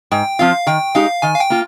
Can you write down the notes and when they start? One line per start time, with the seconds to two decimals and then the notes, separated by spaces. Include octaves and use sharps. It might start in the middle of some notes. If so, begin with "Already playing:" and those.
0.12 G#2 G5
0.39 F3 C4 F4 F5
0.67 D#3 G5
0.95 G#3 D#4 G4 F5
1.22 D#3 G#5
1.35 F5
1.40 G5
1.50 A#3 F4